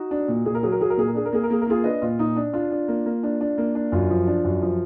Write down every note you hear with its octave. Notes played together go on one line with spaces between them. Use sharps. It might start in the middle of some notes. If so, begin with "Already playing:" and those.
Already playing: D#4 F#4
D4
A#2
A#2 G#4
A#4
F#3 G#4
A#4
F#3 G#4
A#4
A#2 G#4
A#4
D4 G#4
A#4
A#3 G#4
A#4
A#3 G#4
A#4
A#3 F4 G#4
D4 B4 D#5
A#2 F4
A#2 D#4
D4
D4 F4
D4
A#3
A#3
D4
D4
A#3
D4
F#2 F4
F3
D4
F#2
F3